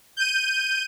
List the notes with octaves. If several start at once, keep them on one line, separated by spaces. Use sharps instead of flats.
G6 D#7